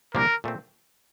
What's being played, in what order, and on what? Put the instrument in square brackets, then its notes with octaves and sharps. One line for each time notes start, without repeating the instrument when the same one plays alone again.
[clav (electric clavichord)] C2 A#2 F3 A#3 D4 [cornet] A#4
[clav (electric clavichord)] A#2 A3 C4